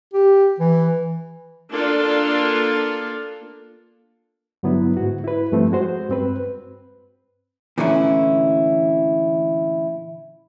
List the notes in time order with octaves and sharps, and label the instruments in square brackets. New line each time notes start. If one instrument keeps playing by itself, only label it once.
[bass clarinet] G4
E3
[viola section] A#3 D4 F4 A4
[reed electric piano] G2 D3 F#3 B3 E4
G#2 F#4
E4 B4
G2 F3 A3 C4
G#3 F#4 C5
G2 C4 B4
[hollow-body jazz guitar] A#2 D3 E3 A3 C#4 E4